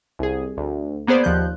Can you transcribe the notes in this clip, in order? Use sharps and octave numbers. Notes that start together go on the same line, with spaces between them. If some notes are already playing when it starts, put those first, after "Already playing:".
C2 G#4
D2
A#3 B3 G#4 C5 D5
D#2 F3 F#6 G6